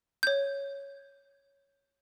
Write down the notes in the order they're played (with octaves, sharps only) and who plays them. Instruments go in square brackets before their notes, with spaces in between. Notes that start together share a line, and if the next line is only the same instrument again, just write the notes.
[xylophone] C#5 G6